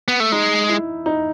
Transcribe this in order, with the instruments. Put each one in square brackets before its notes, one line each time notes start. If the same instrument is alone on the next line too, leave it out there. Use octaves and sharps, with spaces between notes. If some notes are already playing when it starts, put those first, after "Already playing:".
[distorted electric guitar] B3
A3
[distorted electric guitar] G#3 [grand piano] D#4
[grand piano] E4
D#4